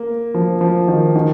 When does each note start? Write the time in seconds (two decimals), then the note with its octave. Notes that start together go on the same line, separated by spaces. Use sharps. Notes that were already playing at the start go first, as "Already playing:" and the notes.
Already playing: A#3
0.34 F3
0.61 F3
0.88 D#3
1.16 D#3